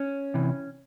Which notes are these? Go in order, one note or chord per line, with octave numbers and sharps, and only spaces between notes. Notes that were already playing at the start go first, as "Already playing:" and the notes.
Already playing: C#4
C3 E3